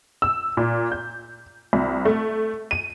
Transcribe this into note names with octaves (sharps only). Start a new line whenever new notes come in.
E6
A#2
G6
C2
A3
D#7